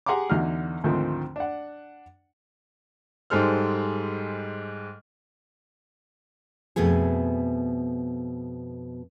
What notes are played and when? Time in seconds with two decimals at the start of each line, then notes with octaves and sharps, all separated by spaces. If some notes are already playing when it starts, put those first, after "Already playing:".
0.06 G4 G#4 F#5 A#5 C6 D6
0.30 E2 D3 D#4 F#4 F6
0.84 D2 G#2 D#3 F3 A3 C4
1.36 D4 F#5
3.30 G#2 G3 G#3 A4 C5 F6
6.76 F2 B2 A3 B3 G#4